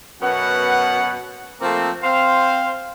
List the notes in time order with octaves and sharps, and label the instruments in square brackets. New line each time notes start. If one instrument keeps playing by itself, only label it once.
[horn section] F#2 B2 B3 C#4 F#5
F3 A3 A#3 C4
C4 C5 F5